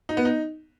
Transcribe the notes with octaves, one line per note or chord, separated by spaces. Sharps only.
D#4
B3
D#4